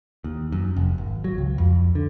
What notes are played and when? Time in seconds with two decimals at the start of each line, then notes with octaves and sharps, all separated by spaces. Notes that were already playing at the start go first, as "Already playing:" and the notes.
0.24 D#2
0.52 F#2
0.76 F1
0.98 G#1
1.24 F#3
1.38 C#2
1.58 F2
1.95 D3